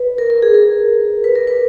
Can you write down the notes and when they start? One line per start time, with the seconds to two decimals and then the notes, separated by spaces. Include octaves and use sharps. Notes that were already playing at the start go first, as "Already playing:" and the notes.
Already playing: B4
0.18 A#4
0.30 A#4
0.42 G#4
0.54 A#4
1.24 B4
1.35 A#4
1.47 B4